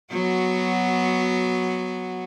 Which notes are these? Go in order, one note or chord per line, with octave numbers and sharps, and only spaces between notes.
F#3 B3 F#4